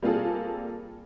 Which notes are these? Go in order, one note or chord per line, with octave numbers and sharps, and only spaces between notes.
G3 A#3 C4 F4 G#4 A4